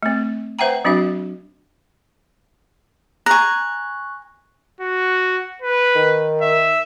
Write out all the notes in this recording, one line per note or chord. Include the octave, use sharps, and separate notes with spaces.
A3 C4
B4 C5 E5 F#5 G5 A#5
F#3 C4 D4 F#4 E5
G#5 A#5 C#6 F#6
F#4
B4
D#3
E5